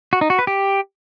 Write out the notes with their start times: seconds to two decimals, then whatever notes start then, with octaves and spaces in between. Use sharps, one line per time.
0.13 F#4
0.21 D#4
0.30 F#4
0.39 B4
0.47 G4